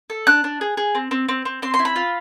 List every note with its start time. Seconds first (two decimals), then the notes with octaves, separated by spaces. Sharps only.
0.10 A4
0.27 D4 F#6
0.44 D4
0.61 G#4
0.77 G#4
0.95 C4
1.11 C4
1.29 C4
1.45 C4
1.62 C4 C6
1.74 C6
1.79 E4
1.85 B5
1.96 F4